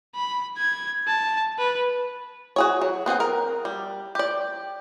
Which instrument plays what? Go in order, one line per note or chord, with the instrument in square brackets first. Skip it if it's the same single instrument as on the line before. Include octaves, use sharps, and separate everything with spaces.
[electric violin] B5
G#6
A5
B4
[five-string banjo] F#4 G#4 C#5
F#3
B3 C4 G#4 F#5
A#4
G3
G4 D5